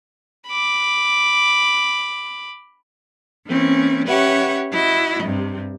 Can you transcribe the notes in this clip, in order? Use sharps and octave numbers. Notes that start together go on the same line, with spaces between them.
B5 D6
E3 A#3 C4 C#4
C#4 G4 B4 C#5 E5 F#5
E4 F#4 D#5
G2 C3